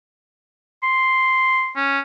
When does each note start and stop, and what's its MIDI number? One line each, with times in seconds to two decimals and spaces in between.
0.83 1.71 84
1.76 2.00 61